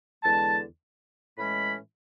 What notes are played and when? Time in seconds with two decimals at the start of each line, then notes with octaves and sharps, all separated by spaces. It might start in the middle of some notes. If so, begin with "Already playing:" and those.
0.23 E2 D3 G#3 A5
1.38 A2 E3 G#3 C#4 B5